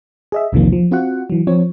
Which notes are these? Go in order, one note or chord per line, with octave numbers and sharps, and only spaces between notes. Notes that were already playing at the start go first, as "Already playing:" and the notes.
G#4 D#5 E5
B1 E2 C3 D#3 F3 A#3
F3
C4 F4 F#4 F#5
E3 F#3
F3 C4 C#5